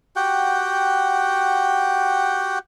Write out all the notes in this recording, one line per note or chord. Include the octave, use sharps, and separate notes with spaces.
F#4 G4 F#5 G5